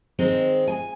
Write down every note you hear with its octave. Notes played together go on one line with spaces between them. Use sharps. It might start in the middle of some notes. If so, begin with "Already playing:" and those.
D#3 G#3 C4
G#5